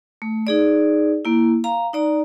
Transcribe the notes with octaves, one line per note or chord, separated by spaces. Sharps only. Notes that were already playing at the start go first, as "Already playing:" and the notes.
A3
D#4 G#4 D5
A#3 E4
F5 A#5
D#4 D5 A#5